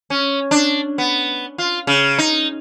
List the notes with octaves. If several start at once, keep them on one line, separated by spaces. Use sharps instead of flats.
C#4
D4
B3
F4
C#3
D#4